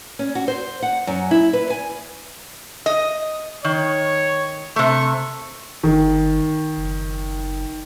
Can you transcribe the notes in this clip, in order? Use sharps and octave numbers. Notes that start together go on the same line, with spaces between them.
C#4
F#4
C5
F#5
F#2
E4
B4
G#5
D#5
D#3 C#5
C3 A3 C#6
G1 D#3
F#1